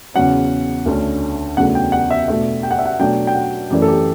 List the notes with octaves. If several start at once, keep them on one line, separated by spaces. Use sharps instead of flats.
E2 C#3 F#3 C#4 F#5
D2 D3 A3 C#4
E2 C#3 F#3 A3 D4 F#5
G5
F#5
E5
B2 A3 D4 E5
G5
F#5
E5
F#5
B2 F#3 A3 D4 G5
G5
F#5
F#2 E3 A3 D5
A4
G4